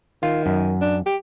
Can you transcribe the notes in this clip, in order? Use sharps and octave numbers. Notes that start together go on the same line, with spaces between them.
D#3 F4
F#2
D4
G4